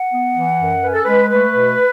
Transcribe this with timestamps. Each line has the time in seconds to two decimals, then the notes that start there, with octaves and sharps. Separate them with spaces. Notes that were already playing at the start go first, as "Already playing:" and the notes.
Already playing: F#5
0.12 B3
0.35 E3
0.59 F#2
0.82 C#4 B4
0.93 A4
1.04 G#3 B4
1.30 A3 B4
1.54 B2